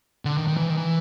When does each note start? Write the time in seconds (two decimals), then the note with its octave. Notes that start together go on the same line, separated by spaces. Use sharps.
0.25 D3
0.37 D#3
0.48 D#3
0.57 E3
0.70 D#3
0.77 E3